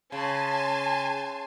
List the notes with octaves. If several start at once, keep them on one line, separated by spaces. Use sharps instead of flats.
C#3 G#5 A5 C6